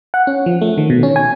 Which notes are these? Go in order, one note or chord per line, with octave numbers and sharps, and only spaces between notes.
F#5
C#4
F3
A3
D#3
B2
C#4
G#5